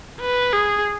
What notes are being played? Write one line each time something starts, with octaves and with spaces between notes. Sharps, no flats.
B4
G#4